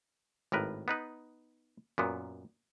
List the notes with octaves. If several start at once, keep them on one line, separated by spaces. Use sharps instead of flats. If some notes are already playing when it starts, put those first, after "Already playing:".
G#1 A2 A#4 B4
B3 D#4 B4
F#2 A#2 B3